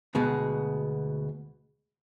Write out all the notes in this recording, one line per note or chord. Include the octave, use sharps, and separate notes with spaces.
D2 B2 G#3